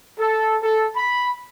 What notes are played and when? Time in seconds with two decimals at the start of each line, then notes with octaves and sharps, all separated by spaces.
0.19 A4
0.63 A4
0.96 B5